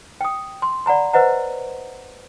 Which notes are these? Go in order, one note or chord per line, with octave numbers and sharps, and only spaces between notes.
G5 D#6
C6
D5 F#5 A#5 B5
B4 C5 D#5 F#5 A#5